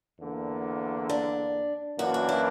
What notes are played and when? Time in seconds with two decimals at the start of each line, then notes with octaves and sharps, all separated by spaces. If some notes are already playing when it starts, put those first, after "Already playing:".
0.20 E2 D3 A#3
1.09 D4
1.98 F#2 E3 A#3 D4 F#4
2.14 F#4
2.29 E4